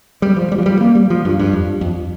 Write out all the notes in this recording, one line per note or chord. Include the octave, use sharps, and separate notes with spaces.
G3
F3
G3
F3
G3
A#3
G3
F3
G2
G2
F2
F2